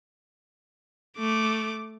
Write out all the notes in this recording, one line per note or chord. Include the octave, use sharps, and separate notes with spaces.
A3 D6